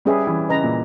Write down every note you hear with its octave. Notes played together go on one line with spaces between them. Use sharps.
G3 C#4 G#4 B4 E5
E3
C#3 B4 D#5 A#5
A#2